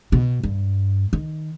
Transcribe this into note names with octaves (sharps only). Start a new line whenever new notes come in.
B2
G2
D#3